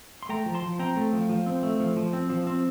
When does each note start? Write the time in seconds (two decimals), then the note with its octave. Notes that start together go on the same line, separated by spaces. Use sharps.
0.23 C6
0.29 A3 G5 A#5
0.46 F3
0.54 A5 C6
0.63 F3
0.79 C4 G5 A#5
0.96 A3
1.13 F3
1.29 F3
1.46 C4
1.63 A3
1.80 F3
1.97 F3
2.13 C4
2.30 F3
2.47 C4